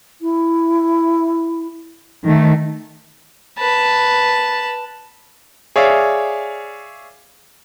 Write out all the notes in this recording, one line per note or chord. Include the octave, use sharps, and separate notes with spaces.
E4
D#3 A3
B4 A5
G#4 C#5 D5 E5 F5